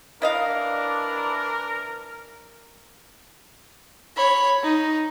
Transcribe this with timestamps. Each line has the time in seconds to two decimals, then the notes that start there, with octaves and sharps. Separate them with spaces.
0.22 E3 D4 E4 A#4 D#5 F5
4.17 C#5 B5
4.63 D#4